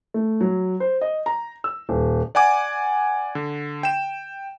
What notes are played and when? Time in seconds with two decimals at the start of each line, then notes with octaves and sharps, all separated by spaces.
0.14 A3
0.41 F#3
0.80 C5
1.01 D#5
1.26 A#5
1.64 E6
1.89 D#1
2.35 D5 F#5 G#5 D6
3.35 D3
3.83 G5 E7